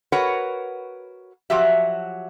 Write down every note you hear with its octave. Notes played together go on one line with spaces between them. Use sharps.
F#4 A#4 B4 C#5 F#5
F3 F#3 F#4 G4 E5